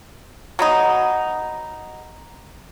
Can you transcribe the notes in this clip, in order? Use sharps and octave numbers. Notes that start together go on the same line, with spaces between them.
F#3 B3 D#4